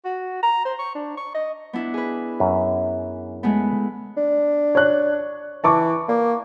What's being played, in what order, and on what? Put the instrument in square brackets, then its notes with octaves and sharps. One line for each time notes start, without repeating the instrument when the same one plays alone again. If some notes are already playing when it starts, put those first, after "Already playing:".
[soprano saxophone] F#4
A#5
C5
C#6
D4
C#6
D#5
[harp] B3 D4 E4
G#4 B4
[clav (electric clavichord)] F#2
[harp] G#3 A3 B3
[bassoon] D4
[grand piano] C#5 F#6
[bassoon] E3 [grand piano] A5 C#6 D6
[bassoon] A#3